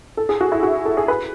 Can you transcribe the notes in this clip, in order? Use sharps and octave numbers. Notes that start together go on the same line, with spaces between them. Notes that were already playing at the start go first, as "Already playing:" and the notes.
A4
G#4
F#4
E4
F#4
A4
G#4
B4